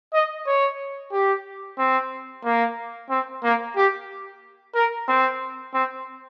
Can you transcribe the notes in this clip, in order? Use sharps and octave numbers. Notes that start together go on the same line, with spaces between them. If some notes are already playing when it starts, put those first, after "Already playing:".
D#5
C#5
G4
C4
A#3
C4
A#3
G4
A#4
C4
C4